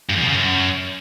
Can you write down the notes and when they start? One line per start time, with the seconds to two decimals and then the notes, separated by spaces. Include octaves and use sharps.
0.10 G2
0.16 E2
0.22 B2
0.28 C#3
0.34 F#2